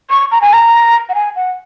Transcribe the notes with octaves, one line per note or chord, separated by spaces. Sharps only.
C#6
A#5
G#5
A#5
F#5
G#5
F#5